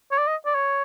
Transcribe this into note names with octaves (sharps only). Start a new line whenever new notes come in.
C#5
D5
D#5
D5
C#5